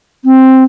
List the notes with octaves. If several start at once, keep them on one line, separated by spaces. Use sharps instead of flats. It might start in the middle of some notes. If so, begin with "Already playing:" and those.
C4